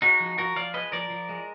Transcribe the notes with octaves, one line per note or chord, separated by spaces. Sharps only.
G#3 D#4 F#4
F3
F3 F#4 A#4
F3 D5 F5
G#3 B4 D#5
F3 A#4 D5
F3
G#3